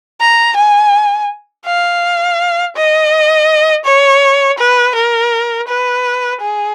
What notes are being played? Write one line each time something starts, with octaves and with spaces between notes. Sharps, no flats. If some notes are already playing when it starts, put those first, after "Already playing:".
A#5
G#5
F5
D#5
C#5
B4
A#4
B4
G#4